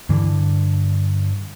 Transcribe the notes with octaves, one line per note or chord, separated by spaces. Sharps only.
G2 D3 E3